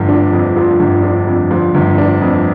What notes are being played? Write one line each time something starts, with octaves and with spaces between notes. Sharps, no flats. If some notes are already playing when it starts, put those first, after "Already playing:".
Already playing: G1 F3
D4
F2
F3
G1
D4
F2
F3
G1
D4
F2